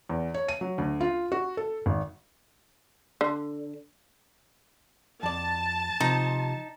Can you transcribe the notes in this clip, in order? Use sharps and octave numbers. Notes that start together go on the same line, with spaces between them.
E2
C#5
D#7
F#3
D2
F4
F#4
A4
G#1
D3
F2 D5 A5
C3 F3 D#4